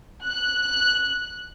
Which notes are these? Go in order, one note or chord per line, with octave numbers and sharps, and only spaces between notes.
F#6